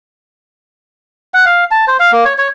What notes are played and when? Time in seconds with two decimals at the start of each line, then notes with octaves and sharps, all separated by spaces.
1.34 F#5
1.46 F5
1.71 A5
1.87 C5
2.00 F5
2.12 A#3
2.25 C#5
2.38 C#5